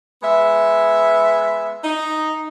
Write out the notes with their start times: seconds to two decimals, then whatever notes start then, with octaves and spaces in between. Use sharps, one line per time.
0.23 G#3 B3 E5
1.84 D#4